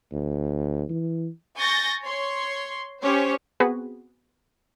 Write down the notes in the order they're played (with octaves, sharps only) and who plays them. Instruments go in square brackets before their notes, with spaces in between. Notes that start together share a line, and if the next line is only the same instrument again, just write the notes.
[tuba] D2
E3
[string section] G#5 C#6 G6 A6 A#6
C#5 C6
C#4 G4 C5 C#5
[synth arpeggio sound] B3 C4 F#4 G#4 B4